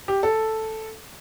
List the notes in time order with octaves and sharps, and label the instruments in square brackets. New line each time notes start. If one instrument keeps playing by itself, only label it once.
[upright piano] G4
A4